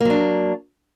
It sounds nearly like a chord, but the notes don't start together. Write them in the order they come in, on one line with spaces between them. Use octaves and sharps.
A#3 F#3 D4